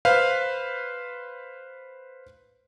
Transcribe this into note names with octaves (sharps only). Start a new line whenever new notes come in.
B4 C5 F5